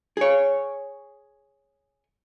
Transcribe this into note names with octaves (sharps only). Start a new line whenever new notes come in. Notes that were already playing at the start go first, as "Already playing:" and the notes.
G#4 C#5